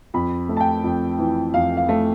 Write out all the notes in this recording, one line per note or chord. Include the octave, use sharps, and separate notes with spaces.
F2 B5
A3
A5
G5
F2
E3
F2 F5
F5
A3